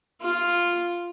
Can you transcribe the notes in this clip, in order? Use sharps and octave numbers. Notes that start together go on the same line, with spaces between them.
F4